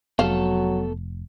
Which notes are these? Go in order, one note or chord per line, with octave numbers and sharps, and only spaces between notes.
F1 F#3 B3 A4 F5 A5